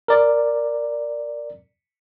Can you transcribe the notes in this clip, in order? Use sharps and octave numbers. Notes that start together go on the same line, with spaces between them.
A#4 D5